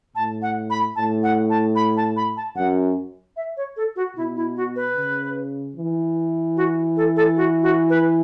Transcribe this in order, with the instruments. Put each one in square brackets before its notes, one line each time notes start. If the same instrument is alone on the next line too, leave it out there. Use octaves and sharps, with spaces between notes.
[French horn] A2 [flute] A5
[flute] F#5
B5
[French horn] A2 [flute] A5
[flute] F#5
A5
B5
A5
B5
A5
[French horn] F#2 [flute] F#5
[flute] E5
C#5
A4
F#4
[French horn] B2 [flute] E4
[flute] E4
F#4
B4
[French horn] C#3
E3
[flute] F#4
A4
A4
F#4
F#4
B4